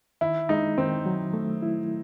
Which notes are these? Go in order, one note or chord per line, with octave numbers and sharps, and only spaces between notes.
D#3 E4
G#3 D#4
D#3 C4
F#3
A3
E4